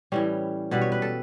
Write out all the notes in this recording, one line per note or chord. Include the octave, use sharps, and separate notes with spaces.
A2 E3 G3 C#4
B2 G3 B4
C#5
B4
A4